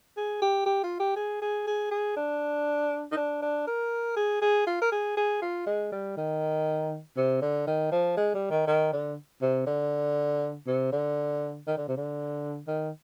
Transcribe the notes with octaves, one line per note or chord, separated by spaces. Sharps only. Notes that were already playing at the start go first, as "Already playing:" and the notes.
G#4
G4
G4
F4
G4
G#4
G#4
G#4
G#4
D4
D#4
D4
D4
A#4
G#4
G#4
F4
A#4
G#4
G#4
F4
G#3
G3
D#3
C3
D3
D#3
F3
G#3
G3
D#3
D#3
D3
C3
D3
C3
D3
D#3
D3
C3
D3
D#3